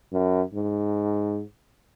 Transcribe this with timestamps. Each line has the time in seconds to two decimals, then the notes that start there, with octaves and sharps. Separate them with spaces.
0.13 F#2
0.54 G#2